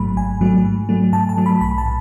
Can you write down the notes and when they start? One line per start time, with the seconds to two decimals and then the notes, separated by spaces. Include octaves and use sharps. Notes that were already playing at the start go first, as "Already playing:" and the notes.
Already playing: G#1 G#2 F#3 A3 B5
0.16 G#1 G#5
0.40 G#2 F#3 A3
0.65 G#2
0.89 F#3 A3
1.12 G#2 A5
1.29 A5
1.37 F#3 A3
1.46 B5
1.61 B1 B5
1.78 A5
1.85 A2